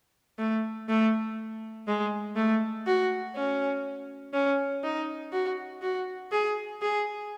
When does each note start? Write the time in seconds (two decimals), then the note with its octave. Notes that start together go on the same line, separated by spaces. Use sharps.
0.39 A3
0.89 A3
1.87 G#3
2.36 A3
2.86 F#4
3.35 C#4
4.34 C#4
4.84 D#4
5.33 F#4
5.82 F#4
6.32 G#4
6.82 G#4